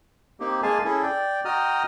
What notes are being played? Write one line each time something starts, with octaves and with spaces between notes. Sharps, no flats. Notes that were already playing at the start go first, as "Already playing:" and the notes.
A#3 C4 D#4 G4
G#3 A#3 G#4 F5 G#5 A5
C#4 E4 G#4 A4
D5 G5
F#4 D#5 G5 A#5 D#6 F6